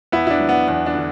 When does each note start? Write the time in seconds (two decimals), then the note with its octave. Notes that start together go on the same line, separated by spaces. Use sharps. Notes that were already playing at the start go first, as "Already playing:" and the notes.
0.12 E2 B3 E4
0.27 E4
0.31 D4
0.40 F#3
0.49 B3
0.68 E2 B3
0.86 D4
0.95 D3